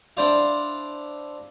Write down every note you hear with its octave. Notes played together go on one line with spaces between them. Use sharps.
D4 E4 C5 D5 F5